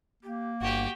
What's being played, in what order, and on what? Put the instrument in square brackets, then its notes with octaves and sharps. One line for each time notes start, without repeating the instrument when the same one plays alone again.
[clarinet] A#3 [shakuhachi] G4
[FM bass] G1 [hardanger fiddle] F#4 G4 [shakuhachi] F#5